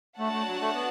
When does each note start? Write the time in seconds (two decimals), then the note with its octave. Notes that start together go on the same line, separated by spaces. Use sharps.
0.19 A3 D4 F#4 C#5 F#5 A5
0.33 A3
0.48 F#3
0.61 A3
0.74 B3